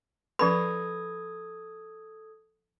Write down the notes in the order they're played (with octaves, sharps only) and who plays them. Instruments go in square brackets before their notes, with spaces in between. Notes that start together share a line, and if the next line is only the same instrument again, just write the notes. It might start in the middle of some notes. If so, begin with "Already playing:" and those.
[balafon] F3 C#4 B4 [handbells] A4 D#6 G#6 [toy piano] B5